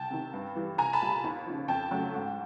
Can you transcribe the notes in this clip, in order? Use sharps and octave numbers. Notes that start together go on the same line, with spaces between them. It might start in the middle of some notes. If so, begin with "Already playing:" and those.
Already playing: C2 G5 A5
C3 D#3
G2
E3 G3
C2 G#5 A#5
A5 B5
A#2 G3
D#2
C#3 F3
F2 G5 A5
C#3 F#3 A3
G#2